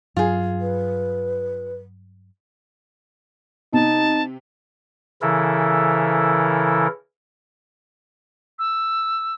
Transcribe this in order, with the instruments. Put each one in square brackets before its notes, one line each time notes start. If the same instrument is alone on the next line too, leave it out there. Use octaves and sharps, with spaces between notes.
[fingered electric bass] G2 F#3 [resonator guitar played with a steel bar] F4 G#4
[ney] B4
[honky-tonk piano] C3 [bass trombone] D#4 [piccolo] A5
[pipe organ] C#3 E3 E4 A4 A#4
[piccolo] E6